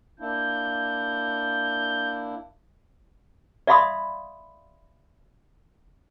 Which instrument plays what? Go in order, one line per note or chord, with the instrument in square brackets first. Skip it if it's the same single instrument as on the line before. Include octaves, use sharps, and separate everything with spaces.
[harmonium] A#3 D4 E4 [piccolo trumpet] G6
[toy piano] D5 E5 F5 B5 C6 D#6